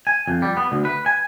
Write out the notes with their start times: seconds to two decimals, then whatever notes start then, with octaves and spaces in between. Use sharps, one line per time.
0.07 G#5
0.28 F2
0.42 G3
0.57 B3
0.72 D2
0.85 B4
1.06 G#5